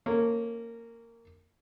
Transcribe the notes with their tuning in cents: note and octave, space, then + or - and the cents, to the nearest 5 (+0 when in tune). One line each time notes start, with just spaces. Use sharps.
A#3 -15 C#4 -20 A4 +0